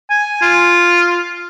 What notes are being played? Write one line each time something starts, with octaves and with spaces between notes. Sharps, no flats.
G#5
F4